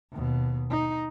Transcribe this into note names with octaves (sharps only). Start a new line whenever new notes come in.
D#2 B2
D#4